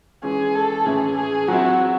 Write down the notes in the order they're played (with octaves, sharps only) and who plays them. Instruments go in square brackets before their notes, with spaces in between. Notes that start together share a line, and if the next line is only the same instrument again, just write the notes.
[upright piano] E3 G#3 C#4 [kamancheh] G#4
[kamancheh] A4
[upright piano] A2 E3 A3 C#4 E4 [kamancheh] G#4
[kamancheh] G#4
[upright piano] F#3 C4 E4 [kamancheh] F#4